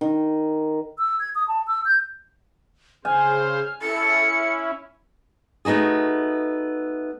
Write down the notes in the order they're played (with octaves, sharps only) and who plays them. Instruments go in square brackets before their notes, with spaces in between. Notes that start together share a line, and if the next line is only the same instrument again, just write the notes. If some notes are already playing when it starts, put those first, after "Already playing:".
[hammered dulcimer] D#3
[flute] E6
G#6
D#6
A5
E6
G6
[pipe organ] C#3 C5 [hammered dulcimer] G#5 [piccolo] F6
[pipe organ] C#4 E4 [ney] A4 [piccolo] C#7
[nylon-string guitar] A3 B3 D#4 F#4 G#4